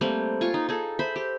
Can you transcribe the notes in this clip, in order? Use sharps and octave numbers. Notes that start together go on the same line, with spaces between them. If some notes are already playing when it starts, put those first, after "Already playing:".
G3 A3 A#3 C4
F4 G#5 C#6
D#4
D#4 G#4 A4
C5 E5 B5
G4